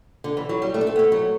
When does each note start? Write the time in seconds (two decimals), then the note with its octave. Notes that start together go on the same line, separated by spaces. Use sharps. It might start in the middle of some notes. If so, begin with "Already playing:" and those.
0.24 D3
0.37 E3
0.49 F#3
0.62 G3
0.74 A3
0.81 D4
0.87 C4
0.96 B3
0.99 A3
1.12 F#3